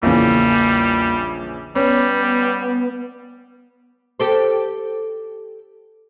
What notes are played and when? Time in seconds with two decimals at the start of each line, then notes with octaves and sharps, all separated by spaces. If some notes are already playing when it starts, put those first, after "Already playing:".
0.03 A#1 E2 C#3 E3 G3 A#3
1.76 G3 B3 C#4 B4
4.20 G4 A4 C5